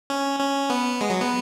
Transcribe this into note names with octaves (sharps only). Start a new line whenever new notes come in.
C#4
C#4
B3
G#3
F#3
B3